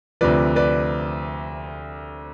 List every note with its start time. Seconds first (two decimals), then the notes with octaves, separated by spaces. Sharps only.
0.21 D2 C3 F3 B4 D5
0.56 B4 D5